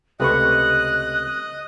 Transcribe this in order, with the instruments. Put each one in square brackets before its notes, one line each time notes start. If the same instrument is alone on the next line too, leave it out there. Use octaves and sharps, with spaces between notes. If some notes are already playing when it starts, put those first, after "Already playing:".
[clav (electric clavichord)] C#2 C3 A3 [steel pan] G4 B4 C#6 [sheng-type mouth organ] D#5 [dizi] F#6